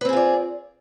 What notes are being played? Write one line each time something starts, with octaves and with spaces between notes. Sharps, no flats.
C4 F4 G#4 B4 D5